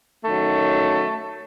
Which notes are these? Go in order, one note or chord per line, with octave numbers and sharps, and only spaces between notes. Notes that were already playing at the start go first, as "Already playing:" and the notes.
F#2 D#3 F#3 A3